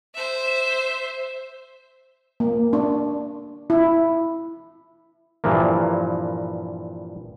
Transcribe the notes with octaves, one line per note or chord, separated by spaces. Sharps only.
C5 E5
A#3
D4
E4
G2 A#2 E3 F3 A#3